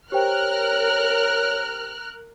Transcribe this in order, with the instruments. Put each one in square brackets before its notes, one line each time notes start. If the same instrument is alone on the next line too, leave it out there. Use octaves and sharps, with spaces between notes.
[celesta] G4 C5 G5 [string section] A#4 F6 F#6 [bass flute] C#5